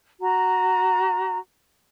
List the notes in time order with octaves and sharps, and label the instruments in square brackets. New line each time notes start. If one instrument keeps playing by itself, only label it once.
[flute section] F#4 A#5